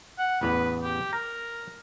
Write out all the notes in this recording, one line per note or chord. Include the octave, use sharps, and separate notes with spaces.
F#5
A1 E2 B3 B4
G4
A#4 A#5